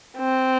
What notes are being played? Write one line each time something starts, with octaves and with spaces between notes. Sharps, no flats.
C4